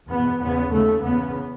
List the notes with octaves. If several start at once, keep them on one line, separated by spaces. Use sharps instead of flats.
E2 B2 B3
E2 C#3 B3
D#2 C#3 A3
E2 C#3 B3